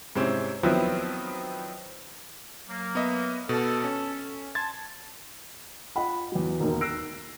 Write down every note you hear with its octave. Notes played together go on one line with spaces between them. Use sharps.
G#2 C3 C4 C#4 E4
D#3 F3 F#3 B3 C4 E4
F#3 A#3
B3 D#5 E5
B2 A4
C#4
A5 C6 G#6 A6
F4 D#5 F#5 B5
E2 F#3
E1 D#2 A#3 D#4
E6 F#6 A#6 C7 D7